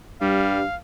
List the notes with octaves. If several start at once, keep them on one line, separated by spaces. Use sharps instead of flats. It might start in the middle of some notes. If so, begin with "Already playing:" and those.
G2 G3 F5